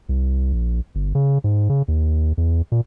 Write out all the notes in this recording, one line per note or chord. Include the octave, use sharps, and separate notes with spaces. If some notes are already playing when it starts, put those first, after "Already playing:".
C2
A#1
G1
C#3
G#2
C#3
D#2
E2
A#2